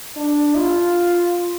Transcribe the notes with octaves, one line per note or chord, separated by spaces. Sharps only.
D4
F4